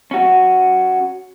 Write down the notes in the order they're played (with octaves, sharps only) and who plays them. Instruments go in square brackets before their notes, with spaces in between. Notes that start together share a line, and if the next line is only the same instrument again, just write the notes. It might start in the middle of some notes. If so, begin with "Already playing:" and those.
[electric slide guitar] C#4 F#4